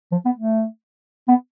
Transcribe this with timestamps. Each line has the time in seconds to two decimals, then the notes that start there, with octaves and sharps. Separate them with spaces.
0.12 F3
0.25 B3
0.38 A3
1.28 B3